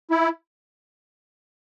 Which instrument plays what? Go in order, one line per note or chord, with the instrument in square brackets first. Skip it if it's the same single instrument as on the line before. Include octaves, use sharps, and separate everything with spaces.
[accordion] E4